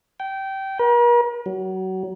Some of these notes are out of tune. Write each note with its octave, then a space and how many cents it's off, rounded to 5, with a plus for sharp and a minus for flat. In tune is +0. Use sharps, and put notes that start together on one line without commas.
G5 -20
A#4 +45
F#3 +25